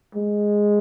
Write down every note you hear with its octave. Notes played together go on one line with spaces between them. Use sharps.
G#3